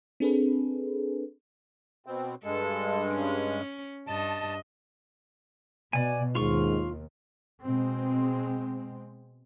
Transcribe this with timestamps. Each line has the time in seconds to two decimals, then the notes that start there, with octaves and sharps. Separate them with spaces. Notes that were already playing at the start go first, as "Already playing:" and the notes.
0.20 C4 D4 G#4 A4 B4
2.06 B2 C4
2.44 G2 G#3 A4
3.13 C#4
4.07 G2 D#5 A5
5.93 B2 D5 G#5
6.35 D#2 G#2 F4 C#6
7.64 B2 G#3 C4